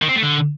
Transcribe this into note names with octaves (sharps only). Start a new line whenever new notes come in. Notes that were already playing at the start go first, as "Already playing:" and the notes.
D#3
C4
A3
D3